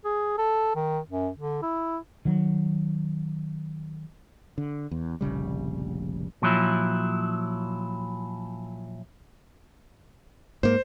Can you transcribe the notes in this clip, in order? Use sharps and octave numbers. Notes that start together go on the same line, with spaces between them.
G#4
A4
D#3
F#2
D3
E4
D#3 F#3
D3
E2
F1 A#1 C#3 G3
A#2 F3 F#3 E4
G#2 A#3 C5